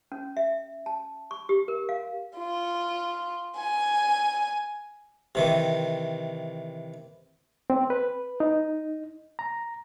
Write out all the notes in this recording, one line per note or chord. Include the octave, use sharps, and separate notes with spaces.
C#4
E5
A5
C#6
G4
A#4
F5
F4
G#5
C3 D#3 E3
C4
B4
D#4
A#5